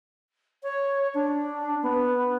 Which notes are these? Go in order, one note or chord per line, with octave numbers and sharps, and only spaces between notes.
C#5
D4
B3